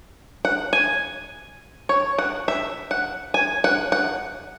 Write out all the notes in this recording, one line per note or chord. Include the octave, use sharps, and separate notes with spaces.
F#5
G#5
C#5
F#5
E5
F#5
G#5
F#5
F#5